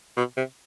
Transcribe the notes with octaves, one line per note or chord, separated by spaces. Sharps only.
B2
C3